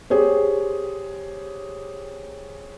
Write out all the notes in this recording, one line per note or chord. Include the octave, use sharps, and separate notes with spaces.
G4 G#4 C5 C#5